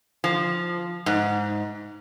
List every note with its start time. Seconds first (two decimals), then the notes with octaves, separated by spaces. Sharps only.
0.24 F3
1.06 G#2